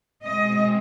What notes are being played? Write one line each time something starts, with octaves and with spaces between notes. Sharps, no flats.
B2 G#3 C4 D#5